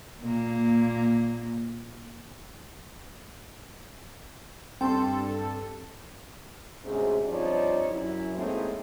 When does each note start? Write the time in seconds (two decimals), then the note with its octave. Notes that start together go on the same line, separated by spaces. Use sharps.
0.21 A#2 A#3
4.81 G2 C4 A4 G5 C6
6.84 D2 G#2 C3 C#4 G#4
7.27 G2 F3 C4 D#4 C#5 D5
7.89 F#2 E4
8.35 A2 G#3 A#3 C4 D#4